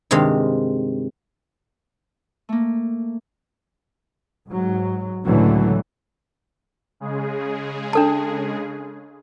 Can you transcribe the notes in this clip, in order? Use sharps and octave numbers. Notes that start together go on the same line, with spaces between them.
G2 C3 D#3 G#3 F5
A3 A#3
G#2 F#3
C#2 A2 D3 E3 F#3 A3
C#3 G#3 G#4
D4 A4 A5